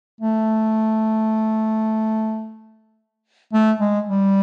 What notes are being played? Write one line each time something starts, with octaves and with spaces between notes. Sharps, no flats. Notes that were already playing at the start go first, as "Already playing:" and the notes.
A3
A3
G#3
G3